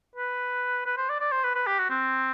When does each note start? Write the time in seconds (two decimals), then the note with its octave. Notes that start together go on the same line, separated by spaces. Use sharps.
0.16 B4
0.86 B4
0.97 C5
1.09 D5
1.20 D5
1.32 C5
1.44 B4
1.55 B4
1.67 G4
1.79 F#4
1.90 C4